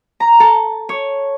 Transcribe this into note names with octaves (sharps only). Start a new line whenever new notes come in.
A#5
A4
C#5